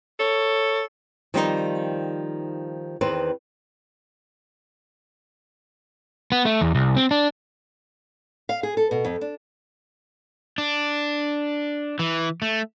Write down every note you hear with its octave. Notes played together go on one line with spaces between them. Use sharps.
A4 C#5
D#3 F3 G3 C4 C#4 D#4
E2 D#3 C4 B4
B3
A3
E2
C2
C4
D4
F5
G#4
A4
B2
F2
D4
D4
E3
A3